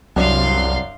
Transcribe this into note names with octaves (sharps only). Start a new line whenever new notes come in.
C2 F#2 C#4 D4 F5 C6